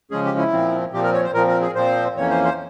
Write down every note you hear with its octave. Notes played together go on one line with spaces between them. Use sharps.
C#3 F3 G#3 C#4 G#4
G4
E4
A#2 F3 C4
A#2 F3 C4 G4
A#4
C#5
C5
A#2 F3 C4 A#4
A#4
G#4
A#2 F3 C4 C5
F2 E3 A#3 C#4 C#5
C5
C5